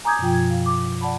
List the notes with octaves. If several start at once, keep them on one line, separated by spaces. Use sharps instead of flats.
G#5 A#5 D6 D#6 G6 G#6
F#2 B2 F3 F4 G5
G#6
F5
D6
D5 F#5 A5 B5